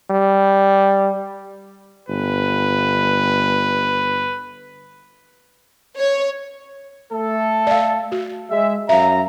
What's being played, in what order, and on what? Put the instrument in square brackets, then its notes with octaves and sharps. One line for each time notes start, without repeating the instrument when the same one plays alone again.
[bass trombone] G3
[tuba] G1 [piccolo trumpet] B4
[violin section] C#5
[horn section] A3 A4
[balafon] D5 F5
F#4
[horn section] G#3 E5
[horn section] F#2 A#5 [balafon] E5 F5